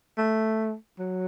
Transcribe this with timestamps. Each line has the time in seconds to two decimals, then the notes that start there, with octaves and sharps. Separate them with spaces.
0.18 A3
0.99 F#3